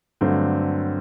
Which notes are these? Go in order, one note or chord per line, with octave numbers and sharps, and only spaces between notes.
G2 D3 F#3 A3 C4